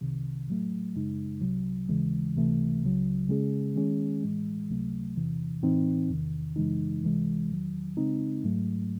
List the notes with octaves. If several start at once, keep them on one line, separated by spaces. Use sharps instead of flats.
C2 C3 D#3
A2 F#3 A3
F#2 C#3 G#3 D#4
C2 C3 F#3
D#2 C#3 E3 G#3
C#2 C3 E3 A3
C#2 C#3 F#3
C#3 G#3 C#4 G#4
D#3 G#3 C#4 G#4
A2 E3 G#3
C#2 C3 F#3 A3
E2 C3 E3
A2 E3 C4 D#4
E2 C3 D#3
F#2 C#3 E3 G#3 D#4
C#2 C3 E3 G#3
E2 D#3 F#3
C#3 G#3 C4 D#4
G#2 F#3 A3